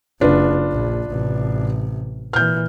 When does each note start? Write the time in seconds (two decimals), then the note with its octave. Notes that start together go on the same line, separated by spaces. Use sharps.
0.21 F#1 D4 F4 B4
0.72 A#1
1.09 A1 C3
2.33 A#2 E3 F6 G6